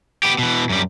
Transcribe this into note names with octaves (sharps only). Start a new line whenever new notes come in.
B3 G4
B2 E3
F#2 G3